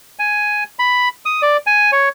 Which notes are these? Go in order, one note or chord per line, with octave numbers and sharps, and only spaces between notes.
G#5
B5
D#6
D5
G#5
C#5